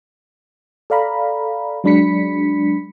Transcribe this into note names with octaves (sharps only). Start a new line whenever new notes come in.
A4 D5 F5 A#5 B5
F#3 G#3 D4 B5 B6 C#7